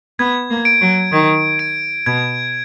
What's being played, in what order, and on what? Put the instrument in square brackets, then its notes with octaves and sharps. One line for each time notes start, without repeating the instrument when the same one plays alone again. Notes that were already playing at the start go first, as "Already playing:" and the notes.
[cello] B3 [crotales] G#6
[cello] A#3
[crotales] D7
[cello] F#3
[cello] D#3 [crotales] G#6
[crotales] D7
[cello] B2 [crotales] G#6